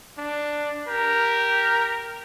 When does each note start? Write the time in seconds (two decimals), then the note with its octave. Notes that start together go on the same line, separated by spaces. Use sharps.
0.18 D4
0.88 G4 A#4